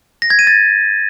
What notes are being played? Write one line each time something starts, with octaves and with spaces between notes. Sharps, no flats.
A#6
G#6
D#7
A6